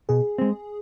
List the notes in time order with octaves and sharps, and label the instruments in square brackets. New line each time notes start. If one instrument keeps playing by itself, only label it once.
[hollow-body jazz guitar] B2 [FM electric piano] G#4
[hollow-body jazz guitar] G#3 C4